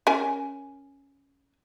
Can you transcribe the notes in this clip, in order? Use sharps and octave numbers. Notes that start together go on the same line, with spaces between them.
C#4 A#4 G#5